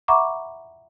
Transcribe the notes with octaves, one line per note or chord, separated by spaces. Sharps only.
E5 F#5 A#5 B5 C#6 D6